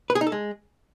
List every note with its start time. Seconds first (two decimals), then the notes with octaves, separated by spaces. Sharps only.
0.10 B4
0.15 G#4
0.21 D#4
0.27 A4
0.32 G#3